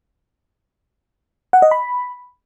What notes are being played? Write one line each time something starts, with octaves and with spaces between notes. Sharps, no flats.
F#5
D#5
B5